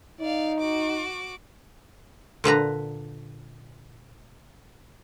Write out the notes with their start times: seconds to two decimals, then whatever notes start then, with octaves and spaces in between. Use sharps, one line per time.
0.20 D#4 D5 F5
0.60 F#4 D6
2.44 A#2 D3 B4 A#5